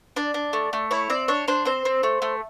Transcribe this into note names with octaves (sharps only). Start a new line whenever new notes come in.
D4 D5
D4
A3
A3
E4 C#5
C4 D5
D4 C#5
D4 C5
C4 C5
C4
A3
A3